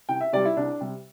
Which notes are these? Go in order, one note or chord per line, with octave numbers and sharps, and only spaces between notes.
C2 G5
E5
C3 G3 D5
E4
C2 D4
C3 G3